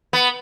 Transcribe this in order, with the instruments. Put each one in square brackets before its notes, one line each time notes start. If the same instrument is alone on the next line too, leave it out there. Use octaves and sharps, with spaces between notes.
[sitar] B3